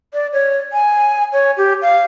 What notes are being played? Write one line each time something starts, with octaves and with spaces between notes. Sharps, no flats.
D5
C#5
G#5
C#5
G4
F5